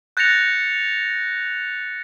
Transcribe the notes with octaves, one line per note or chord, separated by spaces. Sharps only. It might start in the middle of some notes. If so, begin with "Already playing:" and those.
F#6 G6 A6 A#6 C#7 F7